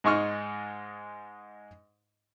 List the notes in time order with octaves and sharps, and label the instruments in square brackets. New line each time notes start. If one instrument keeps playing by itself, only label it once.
[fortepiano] G#2 G#3 D#4 C#6 F6